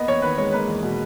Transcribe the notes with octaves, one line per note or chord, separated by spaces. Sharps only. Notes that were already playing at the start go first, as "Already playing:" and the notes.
Already playing: A#3 B3 D#5
E2 C#5
D#3 B4
G#3 C#5
A#3 B4
E2
B2